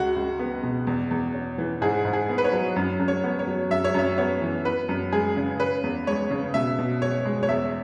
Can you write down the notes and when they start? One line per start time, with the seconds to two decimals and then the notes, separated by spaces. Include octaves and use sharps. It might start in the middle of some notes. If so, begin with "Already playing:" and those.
Already playing: C#2 F#4
0.16 C#2
0.39 B3
0.63 B2
0.87 E2
1.11 E2
1.34 C#4
1.58 E3
1.81 G#2 G#4
2.05 G#2
2.13 G#4
2.29 B3
2.38 B4
2.44 C#5
2.53 F#3
2.76 F#2
2.99 F#2
3.08 C#5
3.24 B3
3.39 C#5
3.47 F#3
3.70 F#2 E5
3.84 C#5
3.94 F#2 E5
4.18 B3 C#5
4.41 E3
4.65 B3 B4
4.89 F#2
5.12 G#3 G#4
5.37 C#3
5.60 C#4 B4
5.84 E2
6.07 G#3 C#5
6.31 C#3
6.54 B2 E5
6.79 B2
7.02 C#4 C#5
7.25 G#3
7.43 C#5
7.49 E2 E5